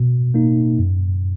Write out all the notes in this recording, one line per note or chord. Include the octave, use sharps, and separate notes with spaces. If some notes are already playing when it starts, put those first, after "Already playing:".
Already playing: B2
A#3 D#4
F#2